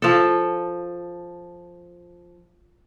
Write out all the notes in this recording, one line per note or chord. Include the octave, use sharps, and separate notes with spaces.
F3 A4